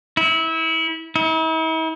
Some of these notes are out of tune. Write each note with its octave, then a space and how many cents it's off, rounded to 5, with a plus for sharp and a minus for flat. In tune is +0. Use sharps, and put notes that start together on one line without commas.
E4 -25
E4 -45